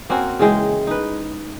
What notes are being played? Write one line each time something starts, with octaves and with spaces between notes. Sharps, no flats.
A#3 C4 C#4 F#4
C#3 E3 G#3 G5
D#4 B4